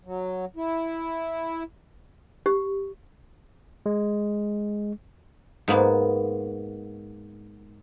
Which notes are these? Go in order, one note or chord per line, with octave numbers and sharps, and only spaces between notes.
F#3
E4
G4
G#3
G#2 A#3 B3